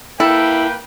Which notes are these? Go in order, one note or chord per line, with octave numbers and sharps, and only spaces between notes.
A#3 E4 A4 B4 G5